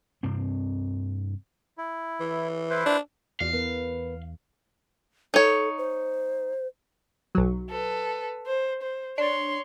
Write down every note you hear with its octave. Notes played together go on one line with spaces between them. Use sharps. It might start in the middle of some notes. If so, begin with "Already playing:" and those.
G2 C3 C4
E4
E3
E4 B4 C5
D4
E2 F4 F#4 D5 F5
B3 A#4 B4
D#4 A4 C#5
C5
B1 F#3
A4 B4
C5
C5
D4 C#5 C6